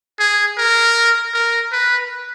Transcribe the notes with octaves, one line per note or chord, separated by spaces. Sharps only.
G#4
A#4
A#4
B4